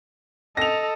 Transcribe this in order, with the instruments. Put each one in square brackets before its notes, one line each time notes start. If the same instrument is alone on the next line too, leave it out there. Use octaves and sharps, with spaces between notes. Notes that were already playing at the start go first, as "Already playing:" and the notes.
[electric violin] A4 D#5 [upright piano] A#6 F7